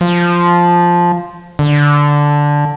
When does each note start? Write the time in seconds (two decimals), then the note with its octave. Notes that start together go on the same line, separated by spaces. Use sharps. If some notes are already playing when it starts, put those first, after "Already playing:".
0.01 F3
1.59 D3